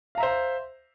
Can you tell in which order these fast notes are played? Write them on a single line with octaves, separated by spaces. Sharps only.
F5 A#5 E5 C5